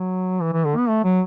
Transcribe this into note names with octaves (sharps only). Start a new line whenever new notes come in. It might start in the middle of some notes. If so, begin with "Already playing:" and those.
Already playing: F#3
E3
E3
D3
B3
A3
F#3